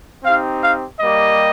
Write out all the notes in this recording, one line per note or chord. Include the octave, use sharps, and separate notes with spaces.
C4 D#4 G4 F5
F5
G3 A#3 G4 D#5